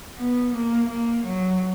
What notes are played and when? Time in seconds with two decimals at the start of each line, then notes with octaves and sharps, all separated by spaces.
0.19 B3
0.55 A#3
0.89 A#3
1.25 F#3